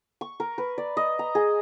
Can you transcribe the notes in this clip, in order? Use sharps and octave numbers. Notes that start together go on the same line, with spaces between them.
C#6
A#4
B4
D5
D#5
A#5
G#4